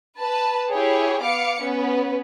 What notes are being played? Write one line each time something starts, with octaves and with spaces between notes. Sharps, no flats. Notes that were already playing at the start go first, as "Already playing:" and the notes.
B4 A5
E4 G4 G#4 C#5
B3 F5 D6 C#7
B3 C#4 B4